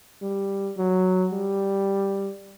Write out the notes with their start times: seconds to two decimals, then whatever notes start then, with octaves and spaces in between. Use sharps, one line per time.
0.22 G3
0.77 F#3
1.32 G3